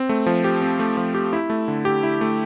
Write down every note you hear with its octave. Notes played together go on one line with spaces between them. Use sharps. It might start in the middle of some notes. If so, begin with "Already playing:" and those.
Already playing: C4
A3
F3
G4
C4
A3
F3
G4
E4
A3
D3
G4
E4
A3